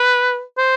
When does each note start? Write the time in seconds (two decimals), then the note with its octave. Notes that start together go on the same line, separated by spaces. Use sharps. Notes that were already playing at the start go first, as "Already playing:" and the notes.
Already playing: B4
0.57 C5